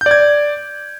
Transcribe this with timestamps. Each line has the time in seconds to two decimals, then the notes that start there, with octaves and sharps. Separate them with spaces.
0.01 G6
0.06 D5
0.11 G#6